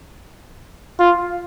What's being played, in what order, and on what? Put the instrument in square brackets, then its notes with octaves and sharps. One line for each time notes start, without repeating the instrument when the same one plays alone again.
[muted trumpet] F4